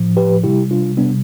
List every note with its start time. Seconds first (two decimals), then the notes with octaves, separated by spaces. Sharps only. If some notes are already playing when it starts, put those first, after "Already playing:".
Already playing: A2 F3
0.17 G4 B4
0.43 C3 G3 E4 G4
0.71 D4 F4
0.97 C3 G3 B3 D4